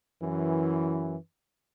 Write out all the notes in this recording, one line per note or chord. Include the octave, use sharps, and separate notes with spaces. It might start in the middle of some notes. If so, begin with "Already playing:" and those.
F#2 E3